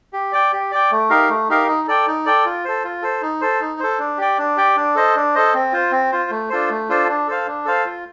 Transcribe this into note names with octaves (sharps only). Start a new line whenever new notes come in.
G4
D5 G5
G4
D5 G5
A3
D#4 G4 A#4 F5
A3
D#4 G4 A#4 F5
D#4
A4 D5 G5
D#4
A4 D5 G5
F4
A4 C5
F4
A4 C5
D#4
A4 C5
D#4
A4 C5
D4
G4 D5 G5
D4
G4 D5 G5
D4
A4 C5 D#5
D4
A4 C5 D#5
C4
F4 C5
C4
F4 C5
A3
D4 F4 A4 C5
A3
D4 F4 A4 C5
D4
A4 C5 F5
D4
A4 C5 F5
F4